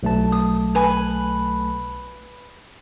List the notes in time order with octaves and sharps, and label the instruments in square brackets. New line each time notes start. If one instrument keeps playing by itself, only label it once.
[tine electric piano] B1 A3 A5
[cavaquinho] D#6
B4 G#5